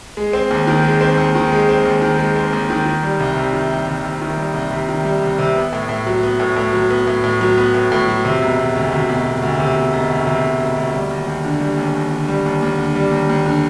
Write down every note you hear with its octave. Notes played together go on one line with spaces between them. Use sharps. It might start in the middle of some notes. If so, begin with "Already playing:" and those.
G#3
C4
D#2
D#3
G#3
C4
D#2
D#3
G#3
C4
D#2
D#3
G#3
C4
D#2
D#3
D#3
G3
C2
C3
D#3
G3
C2
C3
D#3
G3
C2
C3
D#3
G3
C2
C3
B3
A2
A2
F#3
B3
A2
A2
F#3
B3
A2
A2
F#3
B3
A2
A2
F#3
C3
E1
E1
D2
C3
E1
E1
D2
C3
E1
E1
D2
C3
E1
E1
D2
G3
D#2
D#2
D3
G3
D#2
D#2
D3
G3
D#2
D#2
D3
G3
D#2
D#2
D3